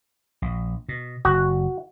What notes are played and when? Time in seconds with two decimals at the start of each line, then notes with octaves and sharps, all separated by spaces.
0.42 A#1
0.89 B2
1.25 F#1 F#4